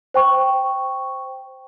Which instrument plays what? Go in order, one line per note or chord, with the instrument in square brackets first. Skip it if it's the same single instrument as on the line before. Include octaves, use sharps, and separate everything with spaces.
[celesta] C5 G5 C#6